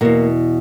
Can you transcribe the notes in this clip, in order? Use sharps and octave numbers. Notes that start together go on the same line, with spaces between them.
E2 B2 A#3